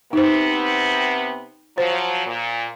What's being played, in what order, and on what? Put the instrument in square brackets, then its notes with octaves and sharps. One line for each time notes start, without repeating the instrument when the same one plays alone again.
[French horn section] C3 B3 C4 [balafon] D#4 C5
[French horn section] F3 F#3 [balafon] C5
[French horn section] A#2